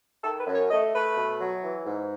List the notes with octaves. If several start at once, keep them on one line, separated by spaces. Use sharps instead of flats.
D#3 A4
B4
F#2
C#5
A3 D#5
A3 B4
B2
F#3
E3
G#2